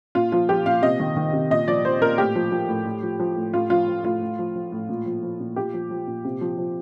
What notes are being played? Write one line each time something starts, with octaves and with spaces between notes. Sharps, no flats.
A#2 F4
F3 F4
F3 G4
A#2 F5
C3 D#5
D#3
D#3
C3
A#2 D#5
F3 D5
F3 C5
A#2 A#4
A2 G4
F3
F3
A2
A2
F3
F3
A2
A2 F4
F3 F4
F3
A2 F4
A2
F3
F3
A2
A#2
F3
F3
A#2
A#2 G4
F3
F3
A#2
C3
F3
F3